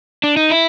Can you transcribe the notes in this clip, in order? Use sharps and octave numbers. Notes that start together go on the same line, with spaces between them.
D4
D#4
E4